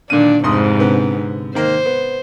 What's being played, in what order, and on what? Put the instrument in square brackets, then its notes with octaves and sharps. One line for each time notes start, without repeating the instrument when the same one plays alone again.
[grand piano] A#2 D3 D#7 [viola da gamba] D#3 D4
[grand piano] F1 C6 D#6 [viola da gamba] G#2 C3
[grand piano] D3 B3 C4
[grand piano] D#3 A#3 [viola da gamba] C5
[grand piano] B3